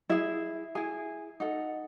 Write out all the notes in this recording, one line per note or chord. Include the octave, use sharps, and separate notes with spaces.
E4 G#4 E5
E4 G#4 G#5
D#4 A4 F#5